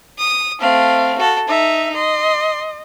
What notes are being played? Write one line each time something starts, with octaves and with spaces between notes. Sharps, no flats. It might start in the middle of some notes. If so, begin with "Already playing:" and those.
D#6
A3 C4 F5
F#4 A4
D#4 E5
D#5 C6